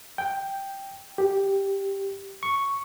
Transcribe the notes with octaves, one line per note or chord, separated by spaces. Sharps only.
G5
G4
C#6